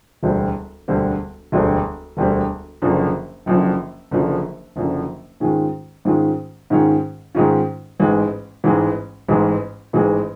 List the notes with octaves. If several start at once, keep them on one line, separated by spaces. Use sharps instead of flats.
E1 D2 D3 G3 C4
E1 D2 D3 G3 C4
E1 D2 D3 G3 C4
E1 D2 D3 G3 C4
F#1 F#2 D3 F3
F#1 F#2 D3 F3
F#1 F#2 D3 F3
F#1 F#2 D3 F3
G#2 D#3 G#3 C#4 F4
G#2 D#3 G#3 C#4 F4
G#2 D#3 G#3 C#4 F4
G#2 D#3 G#3 C#4 F4
A1 G#2 E3 G#3
A1 G#2 E3 G#3
A1 G#2 E3 G#3
A1 G#2 E3 G#3